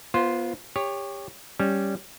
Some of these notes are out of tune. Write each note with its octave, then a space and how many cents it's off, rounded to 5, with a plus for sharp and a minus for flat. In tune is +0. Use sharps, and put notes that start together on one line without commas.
B3 -25 F4 +0 C5 +0
G4 +25 C#5 +0
G3 +0 C#4 +0